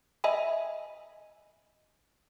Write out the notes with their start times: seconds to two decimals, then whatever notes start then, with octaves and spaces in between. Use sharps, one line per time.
0.24 D#5 E5 G#5 B5